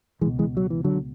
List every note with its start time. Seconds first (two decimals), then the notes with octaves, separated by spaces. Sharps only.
0.21 C#2 E3 G#3
0.25 B2
0.39 E3 G#3
0.57 F#3
0.70 E3
0.84 D3 F#3